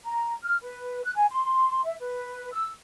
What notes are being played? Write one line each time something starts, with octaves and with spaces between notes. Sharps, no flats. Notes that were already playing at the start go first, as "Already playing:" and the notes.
A#5
F6
B4
F#6
G#5
C6
E5
B4
E6